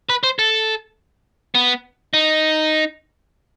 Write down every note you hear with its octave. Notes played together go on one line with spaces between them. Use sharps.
B4
C5
A4
B3
D#4